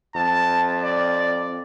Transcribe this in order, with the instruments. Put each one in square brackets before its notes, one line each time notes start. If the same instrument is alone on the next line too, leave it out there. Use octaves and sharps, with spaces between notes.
[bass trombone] F2 [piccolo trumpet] A5
[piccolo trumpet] D5